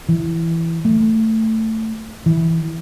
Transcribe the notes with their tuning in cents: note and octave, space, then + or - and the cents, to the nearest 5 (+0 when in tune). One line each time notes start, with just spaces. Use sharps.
E3 +5
A3 +15
E3 -10